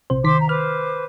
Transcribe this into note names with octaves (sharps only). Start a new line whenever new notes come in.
A#1 C3 C5
D#3 C5 C6 D6 B6
A#5
B4 C5 D6 F6